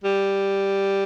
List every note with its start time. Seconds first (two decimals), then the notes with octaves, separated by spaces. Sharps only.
0.04 G3